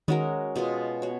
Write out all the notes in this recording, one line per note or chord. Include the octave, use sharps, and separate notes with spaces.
D#3 G#3 C#4 F#4 A#4
B2 G#3 B3 F4
F#4 C#5